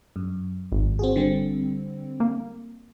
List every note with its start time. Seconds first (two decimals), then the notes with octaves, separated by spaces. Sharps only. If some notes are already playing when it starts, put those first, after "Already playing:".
0.16 F#2
0.72 G#1
0.99 C4 F#4 G#4
1.16 D3 G3 C4
2.20 A#3